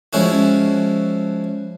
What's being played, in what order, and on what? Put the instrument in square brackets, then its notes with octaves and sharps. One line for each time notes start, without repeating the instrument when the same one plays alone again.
[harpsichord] F3 G#3 C#4 E4 F#4